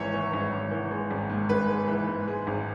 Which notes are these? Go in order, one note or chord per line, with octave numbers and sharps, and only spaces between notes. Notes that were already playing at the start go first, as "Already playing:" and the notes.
Already playing: G#1 E3 C#5
E3
G#1
G#1
E3
G#3
G#1
G#2
G#1 B4
G#3
E3
G#2
G#3
G#1